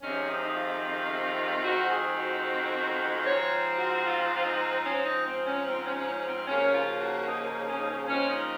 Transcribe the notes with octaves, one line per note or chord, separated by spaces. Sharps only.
F2 C3 D#3 G#3 C4 C#4
D#4
D#4
F4
F2 D#3 G#3 C4 F#4
G#4
F#4
G#2 F3 C4 C#5
F#4
F4
F4
D#4
G#2 F3 C4 C#4
D#4
C4
C#4
C4
C#4
C#4
C4
D#2 C#3 F3 A#3 C#4
F4
F4
F#4
C#4
D#4
C#4
D#4
C#4
A#2 F3 G#3 C4 C#4
D#4